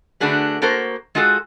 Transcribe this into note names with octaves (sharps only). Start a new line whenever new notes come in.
D3 A3 D4 F#4 G#4 B4
A#3 F#4 A4 A#4 C5
G#3 F4 F#4 G#4 A4